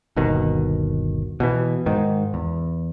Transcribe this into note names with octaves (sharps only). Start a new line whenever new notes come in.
G1 D#2 B2 D#3
B2 D#3 E3
G#2 D#3
E2